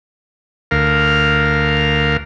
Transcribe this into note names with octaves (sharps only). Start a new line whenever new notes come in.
D2 A#4 F5